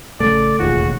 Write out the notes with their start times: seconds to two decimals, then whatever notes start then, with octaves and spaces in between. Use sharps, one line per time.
0.20 A1 C#3 A3 D5
0.59 E1 A1 D#2 F4 F#4 G#4